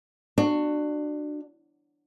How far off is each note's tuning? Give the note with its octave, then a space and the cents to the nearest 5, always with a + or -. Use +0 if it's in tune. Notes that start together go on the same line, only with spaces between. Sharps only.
D4 +25 F#4 +0